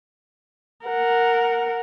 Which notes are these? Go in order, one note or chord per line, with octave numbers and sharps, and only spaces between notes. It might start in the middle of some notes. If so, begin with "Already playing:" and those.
A#4 F#5